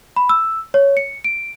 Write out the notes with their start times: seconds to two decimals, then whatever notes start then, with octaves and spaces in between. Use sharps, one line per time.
0.16 B5
0.29 E6
0.74 C#5
0.97 C#7
1.24 D7